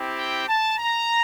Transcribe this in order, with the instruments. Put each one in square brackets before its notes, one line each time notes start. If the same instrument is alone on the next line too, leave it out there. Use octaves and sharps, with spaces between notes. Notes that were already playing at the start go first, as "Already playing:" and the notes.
Already playing: [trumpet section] C4 E4 G4
G5
A5
A#5